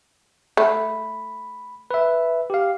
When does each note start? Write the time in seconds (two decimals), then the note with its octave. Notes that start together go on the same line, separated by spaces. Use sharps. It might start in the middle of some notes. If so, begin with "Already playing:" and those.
0.57 A3 B5
1.91 B4 E5
2.50 G4 F5